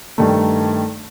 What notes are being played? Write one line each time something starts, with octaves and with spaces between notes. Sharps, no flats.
G2 D#3 A3